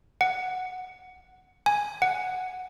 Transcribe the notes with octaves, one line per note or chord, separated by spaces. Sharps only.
F#5
G#5
F#5